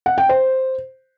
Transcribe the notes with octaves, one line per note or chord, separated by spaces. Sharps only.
F#5
G5
C5